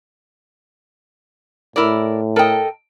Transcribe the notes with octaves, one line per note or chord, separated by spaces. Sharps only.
A2 E4 A#4 D5
A4 A#4 D#5 G5